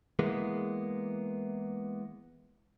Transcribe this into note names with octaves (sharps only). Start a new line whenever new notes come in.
E3 G#3 A#3 B3